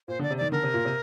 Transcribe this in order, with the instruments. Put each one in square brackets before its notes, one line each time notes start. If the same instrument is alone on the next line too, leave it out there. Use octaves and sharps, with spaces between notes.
[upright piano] A#2 [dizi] C5
[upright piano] D3 [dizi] D5
[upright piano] C3
[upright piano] D#3 [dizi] D5
[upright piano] D3 [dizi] A#4
[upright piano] C3
A#2
C3